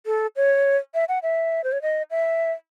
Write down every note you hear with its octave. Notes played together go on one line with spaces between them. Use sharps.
A4
C#5
E5
F#5
E5
C5
C#5
D#5
E5